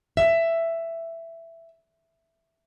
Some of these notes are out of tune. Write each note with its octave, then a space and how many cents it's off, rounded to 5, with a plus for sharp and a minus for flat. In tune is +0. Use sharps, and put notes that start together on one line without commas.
E5 +10